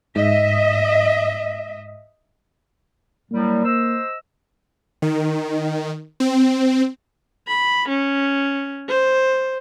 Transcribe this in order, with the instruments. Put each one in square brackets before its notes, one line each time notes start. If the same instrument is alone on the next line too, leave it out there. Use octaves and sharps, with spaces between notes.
[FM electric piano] G#2 [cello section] D#5 E5
[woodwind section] A2 F#3 G3 [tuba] A#3
[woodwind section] C5 D#5 E6
[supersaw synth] D#3
C4
[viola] B5
C#4
C5